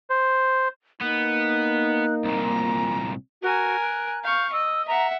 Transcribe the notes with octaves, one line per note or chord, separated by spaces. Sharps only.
C5
A#3 B3 D#4 F#6
C2 A#2 A#5
F#4 A#4 G#5
F#6
F5 C#6 G6
D#5 E6
E5 F#5 A#5